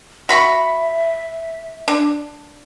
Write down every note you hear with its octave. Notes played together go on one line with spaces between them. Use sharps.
F#4 E5 B5 C#6
D4